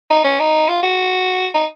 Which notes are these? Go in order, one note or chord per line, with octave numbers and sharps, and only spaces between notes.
D#4
C#4
D#4
F4
F#4
D#4